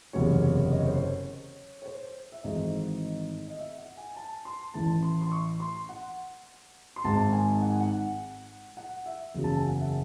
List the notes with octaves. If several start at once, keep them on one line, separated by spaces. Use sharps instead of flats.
F#1 E2 C3 F#3 C#5
C#5
D#5
C#5
C5
C#5
C#5
C5
E5
G#1 G#2 E3 A3 D#5
D#5
E5
F#5
G#5
A5
C6
A1 A2 E3 A3 A5
C6
C6
C#6
C6
F#5
C6
G#1 G#2 D#3 G#3 A5
G#5
F#5
G#5
F#5
F#5
E5
F#1 E2 C#3 F#3
A5
G#5
F#5
E5